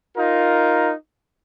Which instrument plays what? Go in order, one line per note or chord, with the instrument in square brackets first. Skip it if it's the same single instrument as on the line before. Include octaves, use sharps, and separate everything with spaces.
[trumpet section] D#4 F4 A#4